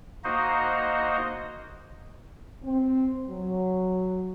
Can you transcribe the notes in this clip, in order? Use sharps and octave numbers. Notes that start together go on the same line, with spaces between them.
A#3 D#4 F#4 C5 D#5
C4
F#3